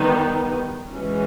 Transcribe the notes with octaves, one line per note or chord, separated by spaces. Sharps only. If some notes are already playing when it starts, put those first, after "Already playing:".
Already playing: D#3 G3 B3 D#4
E3 G#3 C#4 F#4